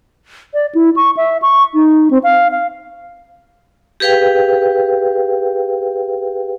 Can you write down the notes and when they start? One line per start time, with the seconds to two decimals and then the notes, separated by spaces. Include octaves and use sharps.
0.54 D5
0.75 E4
0.96 C#6
1.17 E5
1.42 C#6
1.74 D#4
2.10 C4
2.23 F5
2.51 F5
4.00 G4 G#4 B4 F5 G5